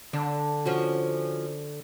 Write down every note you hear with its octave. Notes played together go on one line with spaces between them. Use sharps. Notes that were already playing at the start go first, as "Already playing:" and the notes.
D3 D4
F3 C#4 F#4